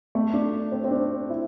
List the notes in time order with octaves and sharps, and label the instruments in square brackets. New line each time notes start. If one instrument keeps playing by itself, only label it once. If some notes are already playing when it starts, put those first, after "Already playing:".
[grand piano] A3
D4
C4
C4
D4
E4